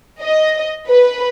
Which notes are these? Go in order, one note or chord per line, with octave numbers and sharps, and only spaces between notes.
D#5
B4